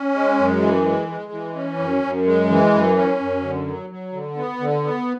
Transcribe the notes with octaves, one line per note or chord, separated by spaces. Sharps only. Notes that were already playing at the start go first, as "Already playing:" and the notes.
Already playing: C#4
G#3
F#2
E3
G#3
G#3
E3
C#4
F#2
F#2
G#3
E3
F#2
C#4
F#2
D3
F#3
F#3
D3
B3
D3
B3